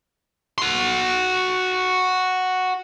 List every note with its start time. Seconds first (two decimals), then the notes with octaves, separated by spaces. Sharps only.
0.58 F#4 C6